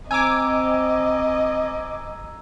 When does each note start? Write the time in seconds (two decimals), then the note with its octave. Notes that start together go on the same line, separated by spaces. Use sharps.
0.11 C4 D#5 G#5 A#5 D6 E6 G#6